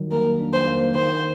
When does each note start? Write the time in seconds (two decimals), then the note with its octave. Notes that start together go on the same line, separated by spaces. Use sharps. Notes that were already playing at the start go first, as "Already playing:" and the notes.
Already playing: D#3 F#3 G3
0.11 A#3 A#4
0.39 D4
0.53 C5
0.67 A#3
0.95 D#3 C5